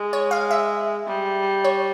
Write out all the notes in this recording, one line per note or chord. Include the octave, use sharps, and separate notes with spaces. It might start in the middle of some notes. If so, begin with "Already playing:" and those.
Already playing: G#3
C#5
F5
E5
G3
C#5